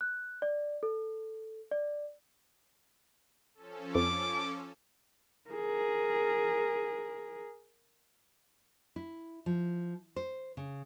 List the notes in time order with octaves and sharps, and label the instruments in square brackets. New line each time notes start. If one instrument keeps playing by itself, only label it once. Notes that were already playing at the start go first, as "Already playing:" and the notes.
[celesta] F#6
D5
A4
D5
[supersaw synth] F3 C#4 A4
[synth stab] F2 [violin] D6
[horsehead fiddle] G#4 A#4
[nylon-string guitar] E4
F3
C5
C#3